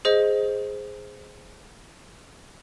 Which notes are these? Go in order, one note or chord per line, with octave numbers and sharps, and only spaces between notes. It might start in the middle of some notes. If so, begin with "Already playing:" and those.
G#4 C5 D#5